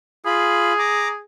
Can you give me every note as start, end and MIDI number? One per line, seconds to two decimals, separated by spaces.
0.26 0.73 65
0.26 1.21 68
0.26 0.73 83
0.79 1.08 82
0.79 1.08 86